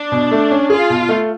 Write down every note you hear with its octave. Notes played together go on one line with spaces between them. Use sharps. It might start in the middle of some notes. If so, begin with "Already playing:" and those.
Already playing: D4
B2
A3
C#4
F4 G#4
B2
A3